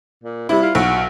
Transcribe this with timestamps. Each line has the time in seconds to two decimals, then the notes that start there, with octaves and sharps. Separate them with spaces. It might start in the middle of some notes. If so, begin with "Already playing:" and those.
0.24 A#2
0.49 C3 G3 E4
0.63 F4
0.75 B1 F#4